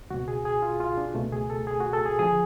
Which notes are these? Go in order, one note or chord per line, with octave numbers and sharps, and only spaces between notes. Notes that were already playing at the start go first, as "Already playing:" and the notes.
C#2 B2 F#4
G#4
G#4
F4
F4
D4
C#2 B2 A3
G#4
A4
G#4
F#4
A4
G#4
D3 F3 G#4